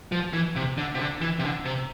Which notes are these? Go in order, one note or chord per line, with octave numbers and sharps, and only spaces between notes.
F3
E3
C3
D3
C3
D3
E3
C3
D3
C3